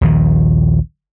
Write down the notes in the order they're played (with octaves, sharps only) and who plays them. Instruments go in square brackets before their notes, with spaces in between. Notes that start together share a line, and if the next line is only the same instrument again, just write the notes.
[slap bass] A#1 D#2 D#3